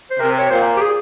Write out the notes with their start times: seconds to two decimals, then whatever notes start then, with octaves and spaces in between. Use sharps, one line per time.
0.11 C5
0.19 C3 A#4
0.39 C#5
0.50 A#2 C5
0.77 G4
0.81 G#4